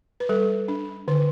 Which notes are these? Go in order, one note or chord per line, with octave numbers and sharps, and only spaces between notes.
B4
G3 A4
D4
D3 B4